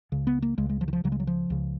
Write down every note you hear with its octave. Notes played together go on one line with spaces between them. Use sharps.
C#2 C#3
B3
A#3
C#2 C#3 G#3
G#3
F3
D#3
F3
C#2 C#3 F#3
G#3
F#3
F3
C#2 C#3